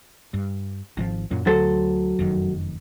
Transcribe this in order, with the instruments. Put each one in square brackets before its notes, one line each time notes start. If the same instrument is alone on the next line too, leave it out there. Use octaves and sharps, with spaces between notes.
[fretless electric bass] G2
G#1 D#3 F3
F#2 A#2 F#3
[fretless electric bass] D2 [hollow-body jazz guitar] F#3 A4 C5
[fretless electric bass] F1 F#2 D#3